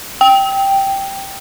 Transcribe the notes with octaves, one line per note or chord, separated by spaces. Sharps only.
G5